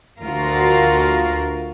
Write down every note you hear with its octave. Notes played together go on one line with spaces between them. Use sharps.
D2 F4 F#4 A#4 F5